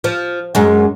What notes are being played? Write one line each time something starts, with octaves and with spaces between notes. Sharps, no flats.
F3
F#2 G#3